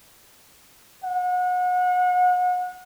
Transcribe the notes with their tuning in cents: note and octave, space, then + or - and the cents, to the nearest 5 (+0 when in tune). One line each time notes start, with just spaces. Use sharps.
F#5 -35